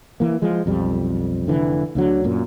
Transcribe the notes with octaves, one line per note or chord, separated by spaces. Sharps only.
E3 A#3
F3 G#3
B1 F2 G3
F1 D3 E3
D2 D3 F#3
F#2 A#2